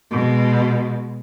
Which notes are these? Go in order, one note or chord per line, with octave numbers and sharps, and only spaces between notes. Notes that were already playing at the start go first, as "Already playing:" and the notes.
B2 G#3